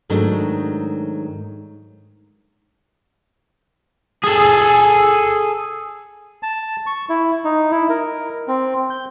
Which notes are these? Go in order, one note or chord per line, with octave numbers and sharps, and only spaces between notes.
G#2 D#3 F#3 G#3 A3 D4
G#4 A4
A5
C#6
E4
D#4
E4
A#4
C4
G6